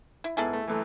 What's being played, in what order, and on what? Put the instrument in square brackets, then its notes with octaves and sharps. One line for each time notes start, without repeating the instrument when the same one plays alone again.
[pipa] E4
[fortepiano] G#2 [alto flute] B3 [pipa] E4 G#4 A4
[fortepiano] A3
[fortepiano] F#2 E3 [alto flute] A3